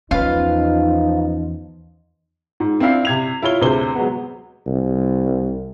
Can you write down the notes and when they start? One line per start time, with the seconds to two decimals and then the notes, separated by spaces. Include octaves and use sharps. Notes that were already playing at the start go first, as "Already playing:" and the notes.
0.11 E2 F3 C#4 D#4 F4 B4 F5
2.60 G#2
2.80 C4 D4 E4 F5 C7
3.05 C3 G#6 F7
3.42 E4 F4 C#5 G7
3.61 D2 C3 G#4 C5 G7
3.95 F#3 G#3 B3
4.67 C2